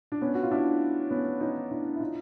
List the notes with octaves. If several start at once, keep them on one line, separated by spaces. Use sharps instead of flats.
D4
B3 C#4
F#4
F4
D4 E4
B3 C#4
C#4 D#4
D4 E4
E4
D#4 F4